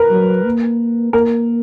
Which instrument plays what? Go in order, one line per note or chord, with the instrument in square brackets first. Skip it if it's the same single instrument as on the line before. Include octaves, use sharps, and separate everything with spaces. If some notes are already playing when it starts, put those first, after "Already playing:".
Already playing: [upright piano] A#4 B4
[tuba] F#3
A#3
[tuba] A#3 [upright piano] A#4